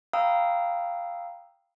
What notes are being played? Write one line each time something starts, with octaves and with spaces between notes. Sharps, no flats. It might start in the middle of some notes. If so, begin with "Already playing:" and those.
F5 G5 A#5 B5 D#6 E6